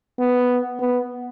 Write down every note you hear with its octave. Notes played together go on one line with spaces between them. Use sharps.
B3
B3